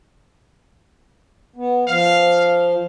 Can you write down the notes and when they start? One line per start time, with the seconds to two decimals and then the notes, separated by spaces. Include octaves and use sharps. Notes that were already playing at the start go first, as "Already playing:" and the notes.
1.56 B3
1.88 F3 F5